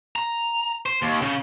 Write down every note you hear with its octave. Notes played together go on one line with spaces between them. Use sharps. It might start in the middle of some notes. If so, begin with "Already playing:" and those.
A#5
C5
D#2
C#3